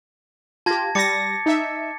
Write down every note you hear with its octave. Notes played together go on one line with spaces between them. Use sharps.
F4 G4 A5 G#6 A#6
G3 D6 A6 A#6 C#7
D#4 E5